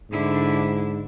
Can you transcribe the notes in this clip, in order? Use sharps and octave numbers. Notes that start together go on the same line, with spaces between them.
G#2 D3 D4 E4